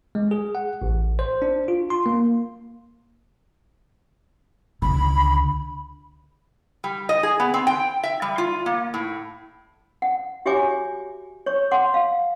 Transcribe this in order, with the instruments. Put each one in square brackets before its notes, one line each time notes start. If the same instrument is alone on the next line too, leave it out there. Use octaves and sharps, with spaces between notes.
[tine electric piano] G#3
G#4
F#5
A1
C5
D4
F4
C6
A#3
[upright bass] C#2 D3 [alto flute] B5
[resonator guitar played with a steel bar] G3
D#5
G#4
B3
C4
G5
E5
G3
F4
A#3
A2
[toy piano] F#5
F#4 G4 C#5 E5 G#5 D6
C#5 C#6
F#5 C6 D6
F5